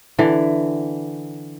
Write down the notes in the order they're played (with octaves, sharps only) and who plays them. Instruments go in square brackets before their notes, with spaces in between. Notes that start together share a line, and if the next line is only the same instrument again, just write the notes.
[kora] D3 E3